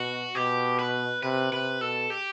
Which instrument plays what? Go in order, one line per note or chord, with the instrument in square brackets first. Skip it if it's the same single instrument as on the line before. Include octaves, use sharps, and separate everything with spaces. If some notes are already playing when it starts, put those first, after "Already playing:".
Already playing: [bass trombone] B2 [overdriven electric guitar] F#4
[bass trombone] B2 [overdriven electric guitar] G4
[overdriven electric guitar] B4
[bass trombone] C3 [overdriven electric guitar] B4
[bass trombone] C3 [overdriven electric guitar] B4
[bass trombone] B2 [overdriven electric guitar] A4
[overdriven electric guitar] G4